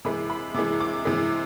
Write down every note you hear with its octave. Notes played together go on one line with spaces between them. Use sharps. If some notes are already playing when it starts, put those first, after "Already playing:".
C3 E3 G#3 B5
B5
C3 E3 G#3 D6
D6
C3 E3 G#3